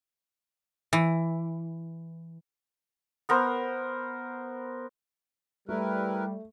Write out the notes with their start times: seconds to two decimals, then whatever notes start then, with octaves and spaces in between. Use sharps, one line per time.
0.93 E3
3.29 B3 A#4 C5
5.69 G3 A3 E4 A#4 B4